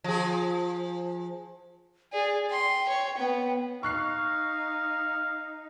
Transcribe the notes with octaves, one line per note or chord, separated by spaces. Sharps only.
F3 G#4
G#4 D5
G5 C6
C#5
B3
D#4 F5 C#6 F#6 C7